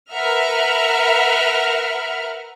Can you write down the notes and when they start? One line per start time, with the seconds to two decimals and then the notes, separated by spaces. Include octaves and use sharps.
0.13 A#4 B4 E5 F#5 F6